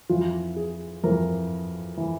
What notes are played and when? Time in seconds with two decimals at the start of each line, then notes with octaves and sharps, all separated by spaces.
0.09 F2 E3 F4
0.56 G#4
1.04 F2 E3 A#4
1.97 E3